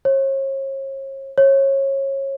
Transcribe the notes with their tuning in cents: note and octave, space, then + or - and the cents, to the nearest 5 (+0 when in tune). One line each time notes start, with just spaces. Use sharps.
C#5 -40
C#5 -25